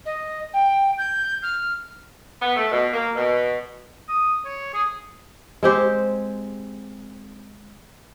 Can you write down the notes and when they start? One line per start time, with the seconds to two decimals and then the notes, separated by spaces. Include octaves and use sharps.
0.05 D#5
0.53 G5
0.98 G6
1.42 F6
2.42 B3
2.56 A3
2.72 B2
2.93 A#3
3.15 B2
4.08 D#6
4.45 C#5
4.74 G#4
5.63 G#3 C4 G4 C5